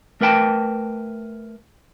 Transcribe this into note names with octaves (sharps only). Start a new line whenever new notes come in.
A3 A#4 B4 G5 A5